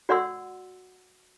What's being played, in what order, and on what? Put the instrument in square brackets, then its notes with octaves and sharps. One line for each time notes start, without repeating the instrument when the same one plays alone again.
[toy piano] F#4 D5 F#5 C6 E6